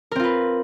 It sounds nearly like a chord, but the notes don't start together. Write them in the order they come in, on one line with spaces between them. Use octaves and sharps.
A#4 C4 F4 B4